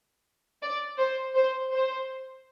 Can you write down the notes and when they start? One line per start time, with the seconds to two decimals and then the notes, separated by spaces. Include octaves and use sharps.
0.62 D5
0.99 C5
1.35 C5
1.71 C5